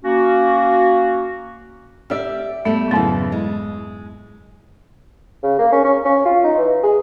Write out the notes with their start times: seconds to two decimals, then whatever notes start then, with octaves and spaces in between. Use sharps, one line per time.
0.04 A#3 C#4 F#4
2.10 G4 D5 E5 F6
2.65 G3 A3 B3
2.91 F2 G#2 C#3 E3 F#3
3.32 G#3
5.43 C#3
5.59 A#3
5.72 C#4
5.84 C#4
6.05 C#4
6.25 F4
6.44 D#4
6.57 E3
6.83 G#4